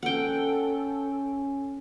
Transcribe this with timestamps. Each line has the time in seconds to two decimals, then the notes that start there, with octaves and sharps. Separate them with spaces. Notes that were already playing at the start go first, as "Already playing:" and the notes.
0.03 C#4 A4 F#5 G5